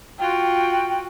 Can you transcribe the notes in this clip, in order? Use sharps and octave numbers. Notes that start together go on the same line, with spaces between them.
F4 F#4 G5